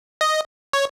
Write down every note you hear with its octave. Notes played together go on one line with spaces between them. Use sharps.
D#5
C#5